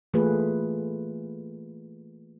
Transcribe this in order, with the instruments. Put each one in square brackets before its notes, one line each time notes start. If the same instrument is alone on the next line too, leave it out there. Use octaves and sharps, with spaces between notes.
[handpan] E3 A3 A#3 F4 G#4 B4